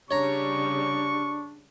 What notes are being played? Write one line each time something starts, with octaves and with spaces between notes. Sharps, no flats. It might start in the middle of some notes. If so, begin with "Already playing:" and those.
C#3 G3 D4 C#5 A#5 C#6